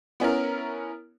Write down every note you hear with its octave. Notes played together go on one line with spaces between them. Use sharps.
B3 C#4 E4 A#4